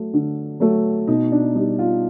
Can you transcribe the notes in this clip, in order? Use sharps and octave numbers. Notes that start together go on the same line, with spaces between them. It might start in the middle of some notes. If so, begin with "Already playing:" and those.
Already playing: F#3 A3
D3
F#3 A3
B2 D#4
D4
G3 D#4
F4